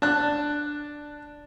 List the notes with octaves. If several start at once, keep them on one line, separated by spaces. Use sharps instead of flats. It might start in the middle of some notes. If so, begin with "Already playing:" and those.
D4 A5 F#6